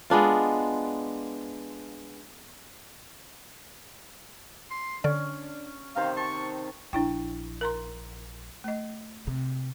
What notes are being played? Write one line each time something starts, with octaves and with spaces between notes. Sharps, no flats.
G#3 B3 D4 F4
C6
D3 C#4 D4 D5
C3 D#3 C5 F5
A5 C#6
A#1 D4 E4 G5
A#4 A#5 C6
A3 D#5
C3